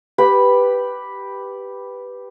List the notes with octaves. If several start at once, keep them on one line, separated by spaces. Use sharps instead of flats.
G4 B4 B5